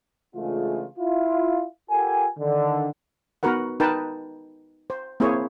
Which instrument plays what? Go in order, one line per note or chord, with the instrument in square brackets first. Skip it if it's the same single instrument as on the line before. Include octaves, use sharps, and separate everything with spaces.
[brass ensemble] C#3 E3 G#3 A3 D4 F4
E4 F4
F4 G4 A4 A#4 F#5 G#5
D3 D#3
[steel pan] B3 D#4 F#4 A#4 B4 F#5
D#4 A#4 B4 G5 A5
C5
A#3 C4 E4 G#4 C5 C#5